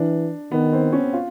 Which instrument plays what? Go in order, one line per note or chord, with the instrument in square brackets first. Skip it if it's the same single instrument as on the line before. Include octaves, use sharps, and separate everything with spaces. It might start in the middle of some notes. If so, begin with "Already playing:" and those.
Already playing: [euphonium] E3 [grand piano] D4
[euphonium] D#3 [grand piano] B3
[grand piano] C4
C#4
F4